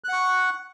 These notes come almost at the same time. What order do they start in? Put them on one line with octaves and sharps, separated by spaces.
F#6 F#5 C#6